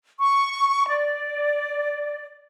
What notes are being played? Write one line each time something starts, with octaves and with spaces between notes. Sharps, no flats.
C#6
D5